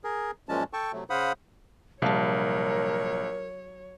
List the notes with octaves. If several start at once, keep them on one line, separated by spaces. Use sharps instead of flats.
G#4 A#4
F#2 A#2 F3 G#3 C#4 A5
A4 G5 A5 C#6
C3 F#3 A3
C#3 C5 F5 F#5 B5 D#6
A#1 C3 F#3 G3 A#4 C#5 F5 A5